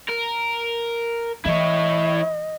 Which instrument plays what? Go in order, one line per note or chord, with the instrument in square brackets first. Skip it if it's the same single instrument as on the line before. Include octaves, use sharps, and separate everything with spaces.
[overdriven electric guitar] A#4
[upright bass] E3 [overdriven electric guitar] E4 C#5 [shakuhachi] D#5